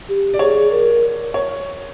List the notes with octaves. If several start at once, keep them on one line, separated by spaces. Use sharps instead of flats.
G4
D5
G#4 C#5
A#4
C#5